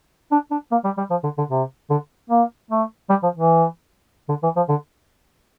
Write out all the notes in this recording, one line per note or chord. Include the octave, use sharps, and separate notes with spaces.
D4
D4
A#3
G3
G3
F3
D3
D3
C3
D3
A#3
A3
G3
F3
E3
D3
E3
F3
D3